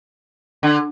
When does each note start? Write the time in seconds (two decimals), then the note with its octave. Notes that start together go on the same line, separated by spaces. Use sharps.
0.63 D3